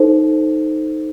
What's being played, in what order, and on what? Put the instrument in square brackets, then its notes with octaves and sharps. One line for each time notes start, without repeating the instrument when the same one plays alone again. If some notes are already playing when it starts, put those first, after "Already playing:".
Already playing: [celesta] D#4 A4 C5